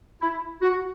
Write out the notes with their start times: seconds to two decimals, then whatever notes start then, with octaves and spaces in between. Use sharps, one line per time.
0.21 E4
0.62 F#4